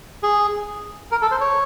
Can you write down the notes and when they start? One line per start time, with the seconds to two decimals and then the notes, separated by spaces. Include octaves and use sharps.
0.23 G#4
1.11 A#4
1.22 A4
1.31 C5
1.41 C#5